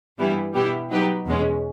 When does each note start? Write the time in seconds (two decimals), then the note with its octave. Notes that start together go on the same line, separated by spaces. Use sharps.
0.18 G2 E3 G3 B3 E4
0.53 B2 G3 B3 E4 G4
0.90 F#3 B3 D#4 G4 B4
1.26 E2 B2 G#3 C#4